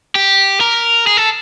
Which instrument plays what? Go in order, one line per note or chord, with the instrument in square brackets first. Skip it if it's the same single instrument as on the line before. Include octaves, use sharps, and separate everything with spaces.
[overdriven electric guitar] G4
A#4
G#4
A4